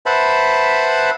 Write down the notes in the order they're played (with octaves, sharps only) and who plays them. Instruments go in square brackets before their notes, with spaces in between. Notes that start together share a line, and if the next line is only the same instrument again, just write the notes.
[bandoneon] B4 C5 E5 F#5 A5 B5